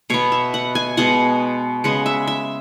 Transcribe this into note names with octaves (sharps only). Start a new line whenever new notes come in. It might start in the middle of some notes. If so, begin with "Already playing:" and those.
B2 B3 C#5
E5
F#5
G#5
B2 G#3 B3 F#5
C#3 G#3 B3 F#5
E5
E5